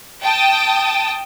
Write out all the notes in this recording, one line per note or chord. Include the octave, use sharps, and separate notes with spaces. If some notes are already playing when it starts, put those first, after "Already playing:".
G5 A5 D#6